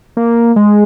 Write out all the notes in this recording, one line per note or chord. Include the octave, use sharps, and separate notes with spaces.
A#3
G#3